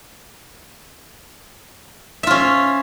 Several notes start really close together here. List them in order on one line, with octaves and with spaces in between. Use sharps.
E5 F4 C#4